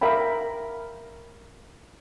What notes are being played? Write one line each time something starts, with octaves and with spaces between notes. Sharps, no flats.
A#4 E5 F5 G5 B5